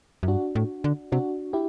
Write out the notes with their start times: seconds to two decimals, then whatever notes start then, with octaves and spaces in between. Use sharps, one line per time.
0.23 F#2
0.28 G2 D4 F#4
0.55 A2
0.84 D3
1.12 C3 D4 F#4
1.53 E4 G4